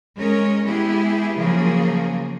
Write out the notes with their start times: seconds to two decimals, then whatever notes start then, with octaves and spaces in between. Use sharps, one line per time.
0.17 G#3 C#4 A#4 C#5 D#5
0.64 G#3 B3 E4 G4 G#4
1.37 C#3 F3 F#3 A#3 G#4